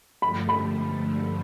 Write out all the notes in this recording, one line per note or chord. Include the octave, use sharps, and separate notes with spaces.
G2 D3 F3 A3 B5
B5